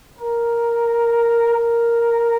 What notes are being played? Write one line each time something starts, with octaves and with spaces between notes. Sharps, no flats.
A#4
A#4